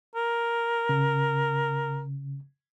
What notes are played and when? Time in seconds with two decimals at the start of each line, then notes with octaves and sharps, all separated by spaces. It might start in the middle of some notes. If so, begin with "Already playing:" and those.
0.15 A#4
0.89 C#3